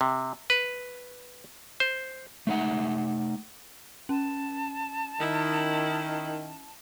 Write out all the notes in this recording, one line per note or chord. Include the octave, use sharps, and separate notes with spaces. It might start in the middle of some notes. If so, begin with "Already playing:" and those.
C3
B4
C5
A3 D#4 F#5
C#4 A5
D#3 E4